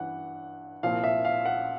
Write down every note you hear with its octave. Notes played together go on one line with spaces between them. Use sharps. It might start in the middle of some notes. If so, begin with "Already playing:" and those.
Already playing: G2 E3 F#5
C2 A#2 F3 F5
E5
F5
F#5